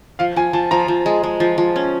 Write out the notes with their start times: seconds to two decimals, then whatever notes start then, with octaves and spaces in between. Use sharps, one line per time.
0.19 F3 F5
0.36 F3 G#5
0.53 F3 A5
0.71 F3 A#5
0.88 F3
1.06 G#3
1.23 G#3
1.40 F3
1.58 F3
1.76 C#4